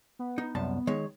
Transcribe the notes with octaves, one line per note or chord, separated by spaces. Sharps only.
B3
D#4
C2 F#2 A5
D#3 G#3 C#5